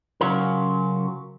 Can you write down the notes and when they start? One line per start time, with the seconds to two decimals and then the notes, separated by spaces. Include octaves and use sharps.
0.21 C#3 F#3 C#4 F4 F#4 A#4